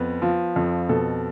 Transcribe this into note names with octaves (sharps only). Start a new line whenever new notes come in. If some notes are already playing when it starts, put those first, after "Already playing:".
Already playing: F2 B3
F3
F2
B2 A4